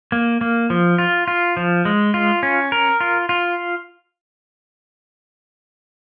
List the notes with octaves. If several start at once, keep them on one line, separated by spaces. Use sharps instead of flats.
A#3
A#3
F3
F4
F4
F3
G#3
F4
C#4
A#4
F4
F4